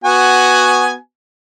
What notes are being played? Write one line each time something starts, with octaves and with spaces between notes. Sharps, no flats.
B3 F#4 G#5